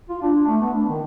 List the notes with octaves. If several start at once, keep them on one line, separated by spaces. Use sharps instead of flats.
F4
D4
A3
B3
D4
D#3